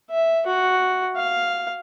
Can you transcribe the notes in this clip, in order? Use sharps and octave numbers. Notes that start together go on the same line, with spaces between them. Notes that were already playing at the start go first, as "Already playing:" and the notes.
E5
F#4
F5